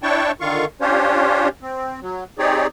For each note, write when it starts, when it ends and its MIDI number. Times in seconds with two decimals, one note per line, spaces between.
0.03 0.32 62
0.03 0.32 64
0.03 0.32 73
0.03 0.32 79
0.03 0.32 81
0.03 0.32 85
0.41 0.65 50
0.41 0.65 51
0.41 0.65 65
0.41 0.65 77
0.41 0.65 85
0.81 1.48 61
0.81 1.48 62
0.81 1.48 65
0.81 1.48 67
0.81 1.48 72
0.81 1.48 73
1.62 2.00 60
2.02 2.24 54
2.39 2.67 60
2.39 2.67 63
2.39 2.67 67
2.39 2.67 68
2.39 2.67 73
2.39 2.67 74